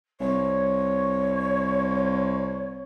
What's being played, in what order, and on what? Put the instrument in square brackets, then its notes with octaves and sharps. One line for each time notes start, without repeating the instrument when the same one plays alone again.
[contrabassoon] C2 [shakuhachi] C#5